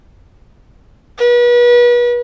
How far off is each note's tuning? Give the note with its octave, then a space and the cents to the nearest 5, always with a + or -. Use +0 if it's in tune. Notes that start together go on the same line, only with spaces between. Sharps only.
B4 -35